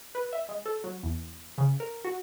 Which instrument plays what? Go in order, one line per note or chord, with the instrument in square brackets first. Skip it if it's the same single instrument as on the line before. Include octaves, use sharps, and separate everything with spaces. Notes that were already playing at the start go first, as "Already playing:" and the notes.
[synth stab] B4
E5
G#3
A4
F#3
E2
C#3
A#4
F#4